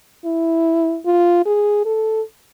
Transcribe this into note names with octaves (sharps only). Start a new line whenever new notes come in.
E4
F4
G#4
A4